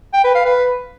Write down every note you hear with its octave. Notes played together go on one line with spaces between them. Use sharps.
G5
B4
F5
B4